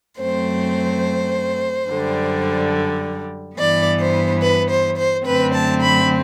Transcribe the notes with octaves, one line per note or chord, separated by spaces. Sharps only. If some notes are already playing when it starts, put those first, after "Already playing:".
F#2 F#3 A3 C4 C5
F#2 D3 G3
G2 E3 B3 D5
C5
B4
C5
C5
F#2 D3 A3 C4 B4
A5
B5